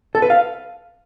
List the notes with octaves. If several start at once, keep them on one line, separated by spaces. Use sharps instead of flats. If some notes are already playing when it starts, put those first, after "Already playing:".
A4
B4
F5